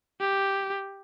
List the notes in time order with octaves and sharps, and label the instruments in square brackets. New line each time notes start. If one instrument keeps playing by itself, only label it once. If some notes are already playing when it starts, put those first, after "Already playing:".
[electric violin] G4